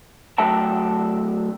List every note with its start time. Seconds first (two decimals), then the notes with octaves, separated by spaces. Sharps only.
0.38 D3 F#3 A3 E5 G5 A5